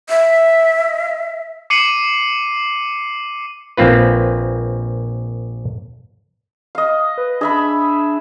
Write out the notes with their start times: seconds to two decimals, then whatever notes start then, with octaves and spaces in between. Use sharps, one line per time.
0.10 E5
1.70 D6 C7 C#7 D#7 F#7
3.77 A#1 A#3 C4 F4 B4
6.75 D#5 F5
7.18 B4
7.41 D4 G#4 E5 B5